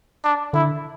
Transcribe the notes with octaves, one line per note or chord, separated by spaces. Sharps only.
D4
D3 E4